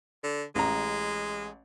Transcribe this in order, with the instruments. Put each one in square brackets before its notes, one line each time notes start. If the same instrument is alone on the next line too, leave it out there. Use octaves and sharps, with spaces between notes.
[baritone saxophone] D3
[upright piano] A1 A#5 [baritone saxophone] G#3